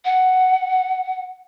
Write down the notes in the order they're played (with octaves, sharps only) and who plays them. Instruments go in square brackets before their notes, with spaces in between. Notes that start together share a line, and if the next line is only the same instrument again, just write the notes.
[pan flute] F#5